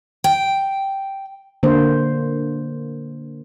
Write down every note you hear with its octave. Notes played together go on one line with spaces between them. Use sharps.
G5
D3 A#3 C5